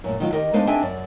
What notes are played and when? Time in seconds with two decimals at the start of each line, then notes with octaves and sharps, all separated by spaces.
0.04 F#2 A#2
0.20 D#3 F#3 F4
0.32 D#3 G4 A#4 D#5
0.53 G#3 B3 D4 D#4 C5 F5
0.67 C4 D4 D#4 G#4 E5 G#5
0.83 F#2 D5